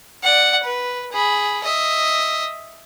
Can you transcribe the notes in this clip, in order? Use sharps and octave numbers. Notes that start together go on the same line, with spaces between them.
D5 F#5
B4
G#4 B5
D#5 E5